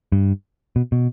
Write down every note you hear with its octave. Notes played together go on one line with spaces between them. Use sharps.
G2
B2
B2